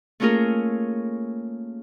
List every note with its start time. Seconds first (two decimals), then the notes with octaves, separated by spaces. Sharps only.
0.20 A3 A#3 C#4 F4 G#4 A#4